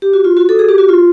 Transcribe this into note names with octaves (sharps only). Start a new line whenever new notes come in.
G4
F#4
F4
F#4
A4
G#4
G4
F#4
F4